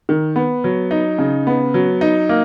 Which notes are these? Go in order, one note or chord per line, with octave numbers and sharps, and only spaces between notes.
D#3
B3
F#3
D#4
C#3
B3
F#3
D#4
A#3